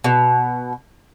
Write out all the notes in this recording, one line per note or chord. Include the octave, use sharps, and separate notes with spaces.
B2